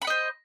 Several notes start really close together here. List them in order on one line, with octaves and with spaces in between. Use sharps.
B5 F#5 D#5 C5